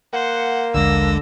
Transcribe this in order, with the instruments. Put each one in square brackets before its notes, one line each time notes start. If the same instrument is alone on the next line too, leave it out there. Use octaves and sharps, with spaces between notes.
[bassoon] A#3 [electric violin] C5 [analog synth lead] F#5
[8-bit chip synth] A#1 D#2 G#3 [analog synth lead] D3 [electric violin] E6 A#6